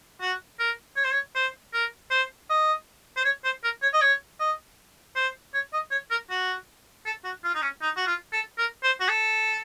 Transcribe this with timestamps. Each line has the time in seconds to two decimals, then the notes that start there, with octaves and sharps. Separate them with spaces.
0.21 F#4
0.59 A#4
0.96 C#5
1.05 C5
1.12 C#5
1.35 C5
1.73 A#4
2.11 C5
2.50 D#5
3.16 C5
3.25 C#5
3.44 C5
3.64 A#4
3.82 C#5
3.93 D#5
4.01 C#5
4.40 D#5
5.16 C5
5.54 C#5
5.73 D#5
5.91 C#5
6.11 A#4
6.30 F#4
7.06 A4
7.24 F#4
7.44 F4
7.55 D#4
7.62 C#4
7.82 D#4
7.96 F#4
8.07 F4
8.33 A4
8.58 A#4
8.83 C5
9.00 F#4
9.09 A4